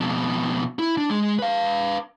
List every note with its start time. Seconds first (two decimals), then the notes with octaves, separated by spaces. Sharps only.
0.01 F2 B2
0.79 E4
0.98 D4
1.10 G#3
1.39 B4 F5